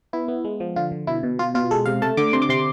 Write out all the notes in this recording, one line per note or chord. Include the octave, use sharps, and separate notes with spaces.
B3 E4
B3
G#3
F3
D3 F4
D3
B2 E4
B2
B2 F4
B2 F4
G#3 A4
C3 F5
A3 A5
D3 D6
C3 C6
D6
C3 C6